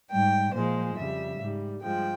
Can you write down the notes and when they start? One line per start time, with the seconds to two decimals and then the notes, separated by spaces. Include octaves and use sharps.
0.10 G#2 G3 G5
0.53 A#2 F3 G#3 C5
0.96 F2 C#3 G3 E5
1.40 G#2 G3
1.81 G2 F3 G#3 G5